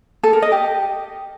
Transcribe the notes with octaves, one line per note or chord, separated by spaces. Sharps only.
A4
A#4
D#5
G4